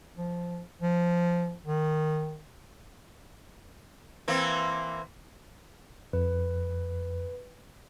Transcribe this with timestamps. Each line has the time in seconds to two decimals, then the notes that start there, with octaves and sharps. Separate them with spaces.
0.18 F3
0.81 F3
1.67 D#3
4.28 E3 A#3 C4
6.13 F2 B4